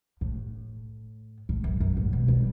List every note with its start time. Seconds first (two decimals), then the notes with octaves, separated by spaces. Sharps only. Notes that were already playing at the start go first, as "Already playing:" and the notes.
0.21 A2
1.49 A2
1.64 F#2
1.80 F#2
1.97 A2
2.13 B2
2.28 G3